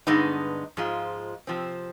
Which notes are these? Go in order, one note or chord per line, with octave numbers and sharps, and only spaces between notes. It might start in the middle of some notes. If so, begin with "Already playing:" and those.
G2 D3 G#3 B3 D#4
G#2 F3 G#3 F4
C3 F3 C4